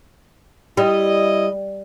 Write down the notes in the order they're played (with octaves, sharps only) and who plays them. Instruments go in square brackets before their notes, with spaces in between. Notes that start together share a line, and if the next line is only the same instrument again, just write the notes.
[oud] G3 [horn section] E4 D#5